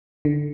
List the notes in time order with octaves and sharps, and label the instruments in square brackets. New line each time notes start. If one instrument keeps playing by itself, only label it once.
[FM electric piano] D3